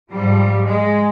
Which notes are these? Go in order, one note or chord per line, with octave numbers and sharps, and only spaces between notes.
G#2 F3 G3
G#3